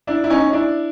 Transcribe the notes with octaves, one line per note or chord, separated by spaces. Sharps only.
D4 E4
E4
C#4 D#4
D4 E4